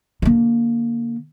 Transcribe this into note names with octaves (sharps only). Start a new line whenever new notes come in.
D3 A#3